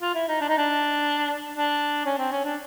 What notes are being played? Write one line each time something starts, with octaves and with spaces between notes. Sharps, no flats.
F4
E4
D#4
D4
D#4
D4
D4
C#4
C4
C#4
D4